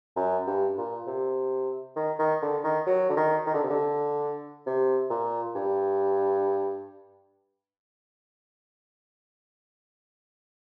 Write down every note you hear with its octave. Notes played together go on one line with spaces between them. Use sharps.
F#2
G2
A#2
C3
D#3
D#3
D3
D#3
F#3
D3
D#3
D#3
D3
C3
D3
C3
A#2
G2